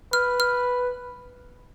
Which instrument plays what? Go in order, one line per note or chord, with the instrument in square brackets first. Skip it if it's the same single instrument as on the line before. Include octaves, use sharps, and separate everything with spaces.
[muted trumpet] B4 [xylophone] F6
[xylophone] F6